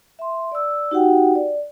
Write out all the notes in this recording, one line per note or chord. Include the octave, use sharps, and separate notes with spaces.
E5 C6
D5 E6
D#4 F#4 G4 F#5 G5
D5